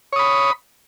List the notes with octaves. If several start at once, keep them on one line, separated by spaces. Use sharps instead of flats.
C#5 B5 D#6